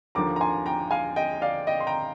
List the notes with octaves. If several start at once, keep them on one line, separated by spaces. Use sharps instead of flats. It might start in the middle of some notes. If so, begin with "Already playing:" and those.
D#2 D3 F3 A#5 D6
A#5
G#5 C6
G5 A#5
F5 G#5
D#5 G5
D5 F5
D#5 G5
C6
G5 A#5